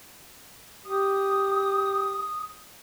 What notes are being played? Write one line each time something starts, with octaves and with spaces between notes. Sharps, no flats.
G4 D#6